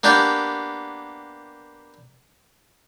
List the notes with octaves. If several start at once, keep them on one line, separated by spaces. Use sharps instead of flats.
A#3 B3 D4 G4 G5